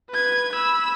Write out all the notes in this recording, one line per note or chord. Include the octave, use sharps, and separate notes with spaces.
B4 G#6
B5 E6